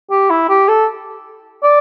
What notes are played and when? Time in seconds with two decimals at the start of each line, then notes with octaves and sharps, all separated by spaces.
0.11 G4
0.30 E4
0.49 G4
0.68 A4
1.63 D5